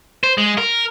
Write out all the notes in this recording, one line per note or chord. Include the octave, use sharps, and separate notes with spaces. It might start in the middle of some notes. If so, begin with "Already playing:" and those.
C5
G#3
A#4